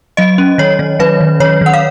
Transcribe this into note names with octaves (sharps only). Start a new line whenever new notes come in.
F#3 D#5
C#4
D#3 C#5
D#3
F#3 B4
D#3
D#3 C#5
D#3 F#5
F5